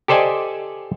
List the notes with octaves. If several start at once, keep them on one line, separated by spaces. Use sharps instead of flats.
G4 A4 C5 D5 D#5 G#5